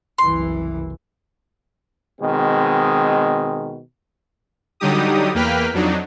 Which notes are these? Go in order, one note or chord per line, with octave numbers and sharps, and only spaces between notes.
F#1 C2 E3 C6
B2 D#3 G#3 C4
D3 F#3 G3 D#4 G4 D#6
E2 A#3 B4 G5 F6 B6
F2 F#3 D4 D#4